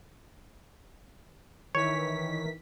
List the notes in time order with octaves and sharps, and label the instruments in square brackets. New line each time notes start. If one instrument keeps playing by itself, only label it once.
[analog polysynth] D#3 E3 B6 [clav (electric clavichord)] C#5